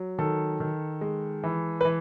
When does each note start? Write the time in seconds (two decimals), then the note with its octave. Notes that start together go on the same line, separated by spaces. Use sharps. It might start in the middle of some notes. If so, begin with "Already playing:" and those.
Already playing: F#3
0.18 D#3 A4
0.60 D#3
1.01 G#3
1.44 E3
1.81 B4
1.85 E3